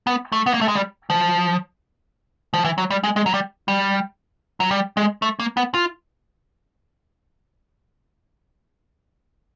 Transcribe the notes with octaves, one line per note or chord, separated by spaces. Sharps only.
B3
A3
B3
A#3
A3
G#3
G3
F3
F3
E3
F#3
G3
G#3
G#3
F#3
G3
G3
F#3
G3
G#3
A3
A#3
B3
F4